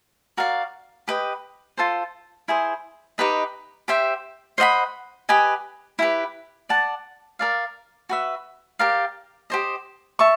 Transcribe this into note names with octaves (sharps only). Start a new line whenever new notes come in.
F#4 A#4 D5 F5
G4 B4 D#5 G5
F4 A4 C5
E4 G#4 C5
D#4 G4 B4 D#5
G4 C5 E5 G5
C5 D#5 F#5 B5
G4 B4 D#5 G#5
E4 G4 B4
D5 F#5 A5
A#4 D5 F5
F#4 B4 E5
G4 A#4 D5 F5
G4 C5 D#5
E5 A5 C#6